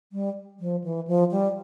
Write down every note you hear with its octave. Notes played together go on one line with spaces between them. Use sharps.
G3
F3
E3
F3
G3